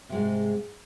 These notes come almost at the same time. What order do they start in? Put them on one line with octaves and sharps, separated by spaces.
C3 G#3 G#2